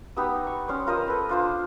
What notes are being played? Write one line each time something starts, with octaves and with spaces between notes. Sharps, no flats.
B3 D#4 G4 E6
C#6
C#4 C5 D5
F4 A#4 C5 D#5
A4 B4
D4 F4 C5